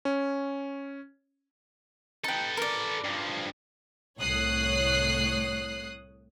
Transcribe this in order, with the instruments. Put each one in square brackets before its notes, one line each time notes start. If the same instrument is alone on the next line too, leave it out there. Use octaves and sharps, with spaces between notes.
[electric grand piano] C#4
[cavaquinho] D#4 G5 [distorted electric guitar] A4 B4
[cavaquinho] A#4 D5
[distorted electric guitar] G2 F3
[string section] C2 A2 C#5 D#6 F#6 C7